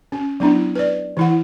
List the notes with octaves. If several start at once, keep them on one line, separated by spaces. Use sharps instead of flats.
C#4
F#3 B3 D4 E4
B4 D5
E3 E4 F#5